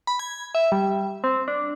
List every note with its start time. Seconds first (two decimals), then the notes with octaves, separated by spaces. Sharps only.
0.07 B5
0.19 G#6
0.55 E5
0.72 G3
1.24 C4
1.48 D4